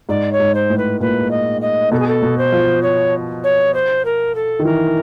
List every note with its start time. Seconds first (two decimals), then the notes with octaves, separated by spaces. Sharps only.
0.09 G#2 D5
0.32 C#5
0.40 G#2
0.54 C5
0.70 A2
0.77 B4
1.00 A#2 B4
1.31 D#5
1.61 D#5
1.91 B2 A4
1.99 G#4
2.07 A4
2.23 B2
2.38 C5
2.52 F3
2.82 C#5
3.43 C#5
3.74 C5
4.05 A#4
4.35 A4
4.59 D#3
4.65 E3 A#4